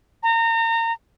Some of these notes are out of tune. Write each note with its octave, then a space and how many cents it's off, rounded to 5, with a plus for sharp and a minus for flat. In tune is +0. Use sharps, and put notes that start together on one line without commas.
A#5 -30